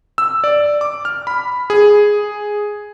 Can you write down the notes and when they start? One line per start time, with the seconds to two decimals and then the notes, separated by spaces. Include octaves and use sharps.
0.18 E6
0.44 D5
0.81 D6
1.05 F6
1.27 B5
1.70 G#4